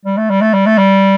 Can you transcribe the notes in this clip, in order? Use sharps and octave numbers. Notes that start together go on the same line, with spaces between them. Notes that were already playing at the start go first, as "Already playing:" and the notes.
G3
A3
G3
A3
G3
A3
G3